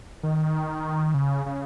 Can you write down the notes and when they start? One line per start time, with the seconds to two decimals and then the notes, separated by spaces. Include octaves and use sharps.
0.23 D#3
1.14 C#3
1.46 C#3